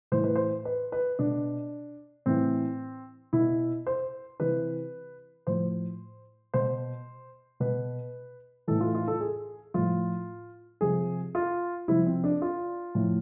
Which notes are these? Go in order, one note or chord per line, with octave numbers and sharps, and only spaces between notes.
A2 E3 C5
B4
C5
B4
B4
B2 D4
A2 E3 C4
B2 E4
C5
C3 E3 B4
A2 F3 C5
B2 C5
B2 B4
A2 E3 A4
F4
F4
A4
G#4
A2 F3 F4
C3 F3 G#4
F4
C3 F3 E4
C4
D4
F4
A2 F3